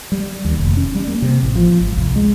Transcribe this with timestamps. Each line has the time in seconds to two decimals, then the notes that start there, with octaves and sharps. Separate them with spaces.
0.12 G3
0.45 D#2
0.58 F1
0.77 C#4
0.95 G3
1.08 A#3
1.22 C3
1.43 A1
1.56 F3
1.81 G#1
1.97 C2
2.16 G#3